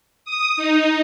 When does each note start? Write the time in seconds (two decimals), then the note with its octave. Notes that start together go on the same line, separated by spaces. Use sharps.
0.25 D#6
0.57 D#4